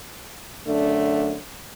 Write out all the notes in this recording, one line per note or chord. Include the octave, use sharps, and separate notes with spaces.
F#2 D3 A3 D4